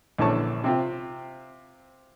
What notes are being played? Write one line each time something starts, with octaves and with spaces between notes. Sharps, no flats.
A#1 D3 E3 C#4 A5 C#6
C3 C4 F4